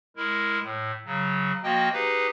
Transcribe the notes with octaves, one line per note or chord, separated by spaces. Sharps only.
G#3 E4 A#4
A2
C#3 F#3
F3 A#3 F#4 D#5 G5
D#4 G4 G#4 B4